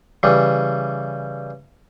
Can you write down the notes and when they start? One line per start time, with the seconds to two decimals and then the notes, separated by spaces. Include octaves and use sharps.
0.23 C#3 E3 G3